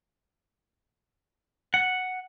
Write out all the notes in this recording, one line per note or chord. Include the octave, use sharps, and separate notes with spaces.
F#5